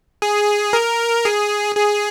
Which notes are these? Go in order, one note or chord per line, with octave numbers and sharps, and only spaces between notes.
G#4
A#4
G#4
G#4